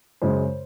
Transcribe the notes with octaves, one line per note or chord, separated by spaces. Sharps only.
F#2 C#3 G#3 C5